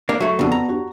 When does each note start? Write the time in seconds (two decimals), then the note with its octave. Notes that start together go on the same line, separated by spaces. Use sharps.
0.09 A#3 D4
0.20 F#3 A3 E5 C#6
0.39 F2 C#3 B3 D4 F#4
0.52 A#5
0.68 D4 F#4 G4